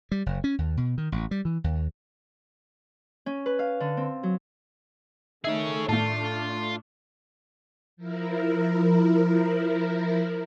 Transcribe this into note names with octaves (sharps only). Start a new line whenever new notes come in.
G3
F#1
C#4
D#2
B2
D#3
A1
G3
E3
D#2
C#4
B4
F5
D3
C4
F#3
D#3 A3 D#4 G#4 A4 C#5 E5
A2 A3 D4 F4 A5
F3 E4 A#4